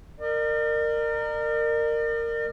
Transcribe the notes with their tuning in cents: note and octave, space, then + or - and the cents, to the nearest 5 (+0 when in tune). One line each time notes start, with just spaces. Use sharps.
A#4 -15 D5 +45